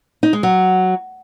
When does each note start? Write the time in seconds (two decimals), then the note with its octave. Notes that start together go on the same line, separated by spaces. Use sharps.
0.23 D#4
0.33 G#3
0.43 F#3